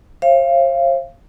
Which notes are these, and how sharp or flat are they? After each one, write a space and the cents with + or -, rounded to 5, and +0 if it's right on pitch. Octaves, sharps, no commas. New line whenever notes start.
C5 +45 F5 -30